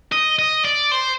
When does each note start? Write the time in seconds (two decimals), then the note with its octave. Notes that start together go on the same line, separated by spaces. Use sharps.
0.12 D#5
0.39 D#5
0.65 D5
0.91 C5